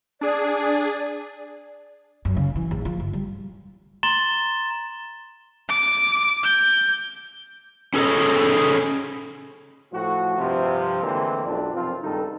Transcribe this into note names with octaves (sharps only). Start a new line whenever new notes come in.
D4 G#4 D5
F#2
C#3
E3
A#1
F3
G1
G3
A#5 C6 A6 E7 G7
D6
G6
C#4 G#4 A4 C#5 D#5
A2 F3 F#4
G2 C3 F3
D2 D3 E3 G#3 A#3 C4
B1 F2 D4
F#2 C3 F3 C4 F4
C#2 G2 D#3 G3 D#4 A4